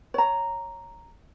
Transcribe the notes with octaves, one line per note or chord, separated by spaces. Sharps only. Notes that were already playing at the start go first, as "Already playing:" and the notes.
C#5 A#5